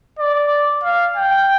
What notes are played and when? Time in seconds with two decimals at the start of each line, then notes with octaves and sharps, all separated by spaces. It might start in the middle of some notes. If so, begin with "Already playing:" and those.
0.19 D5
0.84 F5
1.16 G5